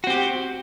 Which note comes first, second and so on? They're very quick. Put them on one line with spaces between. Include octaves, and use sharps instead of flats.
F#4 C4 G4